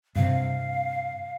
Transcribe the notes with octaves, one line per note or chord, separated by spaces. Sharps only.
G2 C3 F5